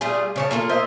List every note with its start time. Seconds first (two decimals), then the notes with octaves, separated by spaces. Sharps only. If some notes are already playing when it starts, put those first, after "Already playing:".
0.01 G3 A3 F4 G#4
0.36 C#3 C#5 A5
0.51 A#3 F4 G#4 A4
0.69 A#3 C5 D#5 E5